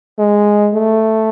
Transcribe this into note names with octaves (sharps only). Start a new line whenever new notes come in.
G#3
A3